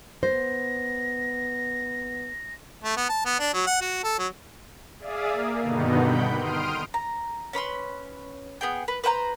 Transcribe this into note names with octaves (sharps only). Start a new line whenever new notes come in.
B3 C5 A#6
A3
B3
A5
B3
D4
F#3
F#5
F#4
A4
F#3
G#4 D5 E5 F5 D#6
A#3
G2 B2 D3 D#3 B3 D#4
F#5 G5 B5 G6
C6 D#6 F6 D7
A#5
C#4 B4 B5 C6
B3 G#4 G5
B4
B4 C5 G5 A#5